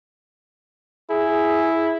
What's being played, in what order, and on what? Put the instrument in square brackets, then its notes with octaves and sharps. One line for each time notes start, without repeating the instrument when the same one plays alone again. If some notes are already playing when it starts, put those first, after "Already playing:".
[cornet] E4 [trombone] G#4